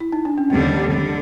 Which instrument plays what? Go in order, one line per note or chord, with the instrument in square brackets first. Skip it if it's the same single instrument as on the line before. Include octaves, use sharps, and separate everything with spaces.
[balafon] E4
D#4
D4
C#4
[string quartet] D#2 D3 G3 [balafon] C4
[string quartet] D3